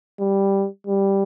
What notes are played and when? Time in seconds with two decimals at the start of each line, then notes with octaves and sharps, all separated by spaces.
0.20 G3
0.87 G3